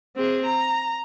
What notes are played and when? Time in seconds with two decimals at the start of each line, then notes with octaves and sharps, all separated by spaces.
0.16 C4 G#4
0.45 A#5